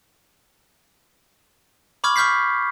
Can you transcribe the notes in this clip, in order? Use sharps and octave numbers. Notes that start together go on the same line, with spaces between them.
B5 C#6 D6 F6 G#6
C#6 F6 G6 B6 C7